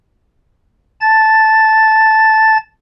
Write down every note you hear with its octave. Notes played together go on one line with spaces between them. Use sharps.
A5 A6